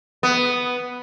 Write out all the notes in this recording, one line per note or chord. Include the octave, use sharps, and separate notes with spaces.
B3